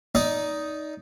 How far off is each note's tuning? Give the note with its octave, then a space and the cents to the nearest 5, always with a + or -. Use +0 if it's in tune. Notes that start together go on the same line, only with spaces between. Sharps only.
D#4 +0 D5 -25